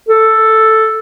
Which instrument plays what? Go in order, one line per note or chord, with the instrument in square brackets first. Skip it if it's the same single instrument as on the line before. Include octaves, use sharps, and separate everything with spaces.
[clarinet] A4